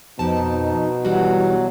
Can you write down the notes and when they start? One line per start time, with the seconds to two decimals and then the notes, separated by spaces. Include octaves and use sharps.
0.19 F2 B2 D#4 A5
1.05 E3 F#3 G3 F#4